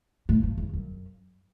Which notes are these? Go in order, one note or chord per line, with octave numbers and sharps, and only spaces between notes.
A2
G2
E2
F#2